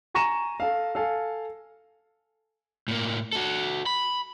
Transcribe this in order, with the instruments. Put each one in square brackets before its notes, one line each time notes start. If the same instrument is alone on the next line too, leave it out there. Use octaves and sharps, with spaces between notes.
[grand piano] G#5 A#5 C#6 A#6 D#7 E7
A4 F5
A4 F5 G#5
[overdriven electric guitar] A2 A#3
F#4 A4
B5